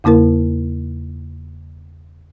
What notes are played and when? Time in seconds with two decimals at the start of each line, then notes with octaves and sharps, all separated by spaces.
0.04 E2 C#3 A#3 E4 A#4